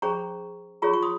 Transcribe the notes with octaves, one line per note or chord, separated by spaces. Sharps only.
C#4 G#4 C5 A#5 C#6
F4 G#4 C#5 A#5 C#6
C#6
C6 D#6